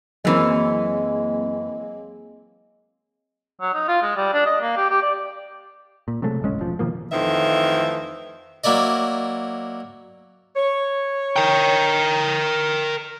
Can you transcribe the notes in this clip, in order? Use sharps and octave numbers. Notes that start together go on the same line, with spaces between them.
F#2 E3 F#3 G#3 A#3 C4 C#5
F#3
D#4
F4
G#3
G3
D4
D#5
A#3
G4
G4
D5
A#2
C3 F#3 G#3 A3
D1 G#1 G#3 C#4
E1 F3
B2 D#3 F3 A#3
F2 D#3 E3 A3 C5 E5
F#3 A#3 E4 D5 D#5
C#5
A#4 G5